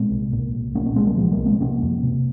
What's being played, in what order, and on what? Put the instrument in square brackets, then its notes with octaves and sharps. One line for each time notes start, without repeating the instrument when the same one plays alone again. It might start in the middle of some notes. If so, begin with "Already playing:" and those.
Already playing: [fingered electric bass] A#2 G#3 C4
C2
A#2
C2
A#2 A#3 C#4
A#3 C#4
C2 G#3 C4
G3 A#3
A#2 F3 G#3
G3 A#3
C2
G#3 C4
C3 A#3 C#4
F2
C3